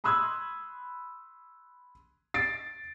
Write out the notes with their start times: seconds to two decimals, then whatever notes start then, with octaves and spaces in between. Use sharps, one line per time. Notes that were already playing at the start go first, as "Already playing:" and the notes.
0.04 B5 C6 D#6 E6 F#6 G#6
2.34 A6 C7 D7